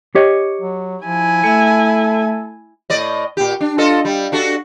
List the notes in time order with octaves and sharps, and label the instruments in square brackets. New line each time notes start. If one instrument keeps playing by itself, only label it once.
[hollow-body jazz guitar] G4 C#5 D#5
[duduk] F#3
[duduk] F3 [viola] E4 G#5
[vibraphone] A3 E5 [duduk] A4
[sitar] A2 D5 D#5
A#2 G4
D4
F4 A4 D#5
G3
D4 F#4 A4